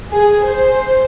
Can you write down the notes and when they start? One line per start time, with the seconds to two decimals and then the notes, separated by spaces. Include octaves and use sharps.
0.10 G#4
0.43 C5